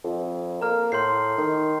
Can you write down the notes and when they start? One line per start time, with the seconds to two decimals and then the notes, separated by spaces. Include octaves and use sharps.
0.04 F2
0.61 A#3 A#5 F6
0.92 A2 C6 G6 C7
1.38 D#3